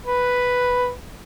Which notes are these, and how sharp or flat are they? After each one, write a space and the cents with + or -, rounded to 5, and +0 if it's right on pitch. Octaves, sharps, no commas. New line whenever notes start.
B4 +0